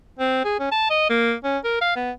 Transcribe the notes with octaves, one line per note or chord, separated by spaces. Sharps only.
C4
G#4
C#4
A5
D#5
A#3
C#4
A#4
F5
B3